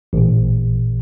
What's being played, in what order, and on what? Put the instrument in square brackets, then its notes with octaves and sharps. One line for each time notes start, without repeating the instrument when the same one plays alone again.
[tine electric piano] A1 A#2